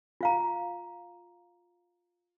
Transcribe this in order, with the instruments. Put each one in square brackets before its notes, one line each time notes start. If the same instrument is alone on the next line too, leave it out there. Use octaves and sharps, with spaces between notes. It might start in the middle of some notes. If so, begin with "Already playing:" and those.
[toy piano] F4 F5 A#5